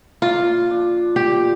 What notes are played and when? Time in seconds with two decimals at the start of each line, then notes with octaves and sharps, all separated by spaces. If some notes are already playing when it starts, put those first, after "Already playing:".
0.22 A#2 F4
0.69 F3 D4
1.16 A#2 G4